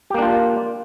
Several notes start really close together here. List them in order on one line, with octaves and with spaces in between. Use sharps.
G4 A#3 D4 F4